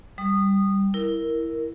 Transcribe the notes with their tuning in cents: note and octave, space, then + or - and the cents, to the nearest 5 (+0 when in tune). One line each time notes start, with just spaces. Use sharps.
G3 +0 D#6 -20
E4 +0 A#4 +0